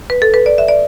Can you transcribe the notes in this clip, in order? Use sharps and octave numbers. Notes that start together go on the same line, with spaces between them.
B4
A4
B4
D5
E5
D5